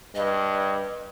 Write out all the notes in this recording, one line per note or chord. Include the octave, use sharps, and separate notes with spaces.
G2 D#5